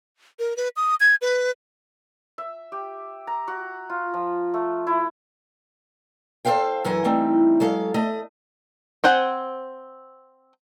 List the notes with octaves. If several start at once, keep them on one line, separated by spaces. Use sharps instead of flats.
A#4
B4
D#6
G#6
B4
E5
G4
A#5
F#4
F4
F3
A3
E4
A4 B4 C5 F5 G5
F#2 E3 F#3 F#5 G#5
E3 G3 A3 C4 D#4
F#3 G#3 A4 F5
A3 D#5
C4 C5 F#5 G#5